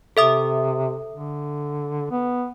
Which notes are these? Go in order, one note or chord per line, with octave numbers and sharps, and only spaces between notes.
C3 A4 E5 D#6
D3
B3